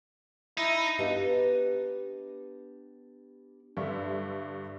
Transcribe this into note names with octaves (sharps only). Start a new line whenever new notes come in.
D#4 E4
B3 D4 G4 B4 D#5 F5
G2 D3 D4 E5 C#6